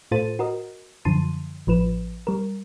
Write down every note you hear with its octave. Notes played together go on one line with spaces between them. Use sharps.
A2 F4 A4 C5 A6 D#7
F#4 A#4 D#5
F#2 D3 F3 A5 C6 D#7
A1 F3 B4 E7
G3 A#4